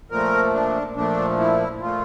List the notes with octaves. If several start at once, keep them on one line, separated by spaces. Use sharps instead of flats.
A#2 F3 A3 A#4
D4
A#2 F3 A3 D4
E4
A#2 F3 A3 F4